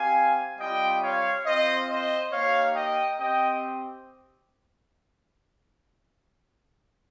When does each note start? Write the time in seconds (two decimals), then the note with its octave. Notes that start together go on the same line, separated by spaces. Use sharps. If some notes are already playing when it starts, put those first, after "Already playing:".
Already playing: C4 G4 F5 G#5
0.59 G3 C4 F4 D#5 G5
1.02 C#5 F5
1.45 C4 F4 C5 D#5
1.89 C5 D#5
2.31 A#3 D#4 G4 C#5 F5
2.75 D#5 G5
3.19 C4 G4 D#5 G5